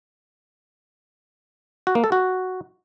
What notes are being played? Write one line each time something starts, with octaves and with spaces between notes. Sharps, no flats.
F#4
A#3
A4
F#4